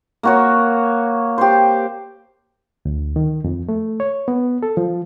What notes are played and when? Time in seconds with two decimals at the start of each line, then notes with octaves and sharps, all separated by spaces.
0.23 A#3 F#4 C#5
1.38 G4 C5
2.85 D2
3.16 D#3
3.44 F2
3.69 A3
4.00 C#5
4.28 B3
4.63 A4
4.77 F3